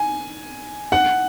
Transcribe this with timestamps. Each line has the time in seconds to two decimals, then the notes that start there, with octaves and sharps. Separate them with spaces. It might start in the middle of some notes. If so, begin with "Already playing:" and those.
Already playing: G#5
0.92 F#5